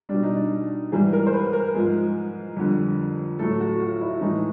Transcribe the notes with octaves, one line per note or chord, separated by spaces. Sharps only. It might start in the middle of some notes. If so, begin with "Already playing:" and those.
B2 G3 D4
D#4
D4
G#2 E3 G3 G#4
A#4
C5
B4
A#4
G#2 F3 G#3
F2 D3 G3
A2 F#3 A3 A4
F#4
F4
E4
A2 E3 G#3 D#4